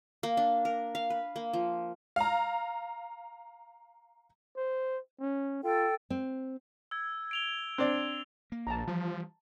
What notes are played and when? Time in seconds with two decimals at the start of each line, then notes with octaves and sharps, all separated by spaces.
0.23 A#3
0.37 D4
0.65 A#4
0.95 F5
1.10 B4
1.36 A#3
1.53 F3
2.16 F5 A#5
4.57 C5
5.20 C#4
5.64 F4 A4 G5
6.10 C4
6.91 E6 G#6
7.31 D7 F7 G7
7.78 C4 D4
8.52 A#3
8.67 A#1 A5 A#5
8.87 E3 F3 G3